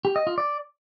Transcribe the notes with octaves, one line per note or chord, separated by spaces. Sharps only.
G4
D#5
F4
D5